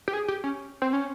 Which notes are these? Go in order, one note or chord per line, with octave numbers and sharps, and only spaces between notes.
G4
G#4
G4
C#4
C4
C#4